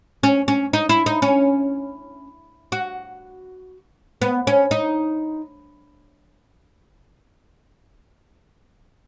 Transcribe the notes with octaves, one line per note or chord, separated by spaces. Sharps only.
C#4
C#4
D#4
E4
D#4
C#4
F#4
B3
C#4
D#4